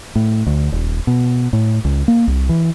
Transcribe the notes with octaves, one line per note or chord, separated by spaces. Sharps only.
A2
D2
D#1
B2
A2
C#2
A#3
C2
E3